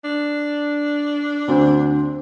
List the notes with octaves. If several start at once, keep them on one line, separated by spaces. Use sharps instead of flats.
D4
D2 C4